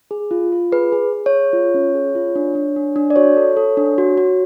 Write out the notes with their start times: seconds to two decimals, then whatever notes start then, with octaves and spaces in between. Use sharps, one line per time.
0.11 G#4
0.31 F4
0.52 F4
0.72 G#4 B4
0.92 G#4
1.13 G#4
1.26 C#5
1.33 G#4
1.53 F4
1.74 C#4
1.94 G#4
2.15 F4
2.35 D4
2.55 D4
2.76 D4
2.96 D4
3.10 D5
3.16 F#4 C#5
3.37 A4
3.57 A4
3.77 D4
3.98 F#4
4.18 F#4